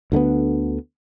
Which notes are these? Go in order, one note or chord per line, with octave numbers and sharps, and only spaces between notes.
D2 D3 G3 B3